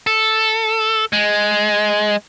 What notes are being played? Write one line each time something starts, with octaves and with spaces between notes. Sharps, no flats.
A4
G#3